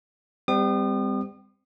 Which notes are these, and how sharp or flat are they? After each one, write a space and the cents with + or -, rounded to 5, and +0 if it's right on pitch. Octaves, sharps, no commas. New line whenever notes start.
G3 +25 C4 -30 D#6 -40